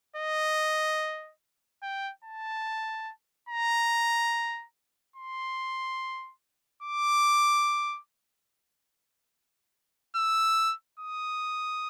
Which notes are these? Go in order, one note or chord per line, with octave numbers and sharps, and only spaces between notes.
D#5
G5
A5
A#5
C6
D6
E6
D#6